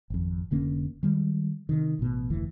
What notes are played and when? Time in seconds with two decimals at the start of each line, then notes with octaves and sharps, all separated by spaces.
0.10 G#1 F2
0.51 F1 D3 A#3 C#4
1.03 D#3 G3 G#3
1.69 C3 D#3
1.99 A1 B2
2.30 F1 D2 E3